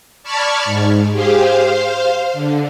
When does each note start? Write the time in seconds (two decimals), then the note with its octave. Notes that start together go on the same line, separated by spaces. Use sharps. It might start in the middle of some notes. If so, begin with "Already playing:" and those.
0.23 D5 A5 B5 C#6 F6 G#6
0.65 G#2
1.12 G4 G#4 C5 F5
1.47 C5 F5
2.33 D3